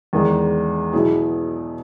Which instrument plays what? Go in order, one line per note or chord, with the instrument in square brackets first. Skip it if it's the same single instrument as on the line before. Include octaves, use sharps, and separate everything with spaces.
[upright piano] E2 D#3 G#3
B2 F#3 B3 E4 G#4